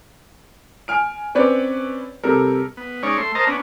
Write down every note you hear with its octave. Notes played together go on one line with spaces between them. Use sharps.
G#5 F6 D7
C4 C#4 B4 C#5 D5
C3 G3 A4 A#4
B3
G#3 C#4 D#4 C#5 D5
A3 C6
A#4 C5 D#5 A5 A#5
B3 C#4 D4